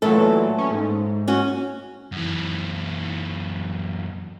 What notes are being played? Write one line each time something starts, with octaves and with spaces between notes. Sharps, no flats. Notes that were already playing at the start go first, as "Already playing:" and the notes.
A#2 E3 F#3 A3 A4
C#4
G#2
C#4 F#4
F#2 E3